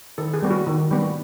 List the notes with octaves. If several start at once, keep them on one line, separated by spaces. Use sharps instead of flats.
D#3 A4
G#4
G3 B3
F#4
D#3
G3 B3